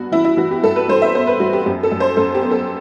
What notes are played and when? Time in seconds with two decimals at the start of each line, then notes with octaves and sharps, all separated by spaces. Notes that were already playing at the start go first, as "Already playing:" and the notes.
Already playing: G2 B3 F#4
0.12 E3 E4
0.24 E4
0.37 E3 F#4
0.51 G4
0.63 G2 A4
0.76 B4
0.88 G2 C5
1.02 E5
1.14 B3 C5
1.27 B4
1.40 G2 F#4
1.53 G4
1.66 F#2 G4
1.83 A4
1.92 F#2
2.00 C5
2.17 F#2 A4
2.35 G4
2.43 B3
2.51 A4